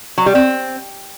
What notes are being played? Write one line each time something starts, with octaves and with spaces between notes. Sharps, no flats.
F#3
G3
C4